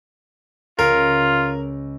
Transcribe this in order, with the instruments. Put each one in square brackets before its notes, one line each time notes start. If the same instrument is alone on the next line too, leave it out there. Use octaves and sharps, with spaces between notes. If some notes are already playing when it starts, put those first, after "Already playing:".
[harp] C#2 [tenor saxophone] F4 [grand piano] A#4